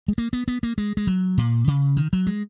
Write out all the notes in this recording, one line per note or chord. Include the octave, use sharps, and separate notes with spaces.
G#3
A#3
B3
B3
A#3
G#3
G#3
F#3
A#2
C#3
D#3
F#3
G#3